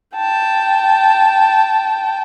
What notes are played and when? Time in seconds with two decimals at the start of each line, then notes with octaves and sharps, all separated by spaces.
0.16 G5 A5